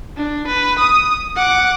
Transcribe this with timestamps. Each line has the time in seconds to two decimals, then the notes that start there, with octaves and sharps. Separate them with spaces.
0.17 D4
0.47 B4
0.79 D#6
1.36 F#5 D6